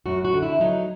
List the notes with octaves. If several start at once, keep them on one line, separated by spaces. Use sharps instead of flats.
F#2 F#4
F#4
D3
E4
F#3 D#4